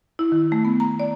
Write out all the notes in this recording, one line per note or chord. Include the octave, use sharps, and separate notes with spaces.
E4
D#3
A3
B3
A#5
D5